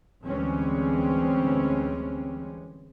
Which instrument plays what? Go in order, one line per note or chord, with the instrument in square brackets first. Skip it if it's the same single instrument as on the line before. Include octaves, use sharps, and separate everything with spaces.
[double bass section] D2 E3 G3 G#3 C4 C#4